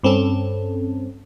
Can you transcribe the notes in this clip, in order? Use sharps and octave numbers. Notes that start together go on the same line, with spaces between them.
G2 C4 C#4 A4